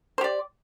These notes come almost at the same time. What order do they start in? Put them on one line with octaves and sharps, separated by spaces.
C5 G4 D5